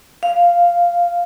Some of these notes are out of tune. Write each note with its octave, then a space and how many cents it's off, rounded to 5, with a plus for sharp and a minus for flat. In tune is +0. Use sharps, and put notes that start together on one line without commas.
F5 -5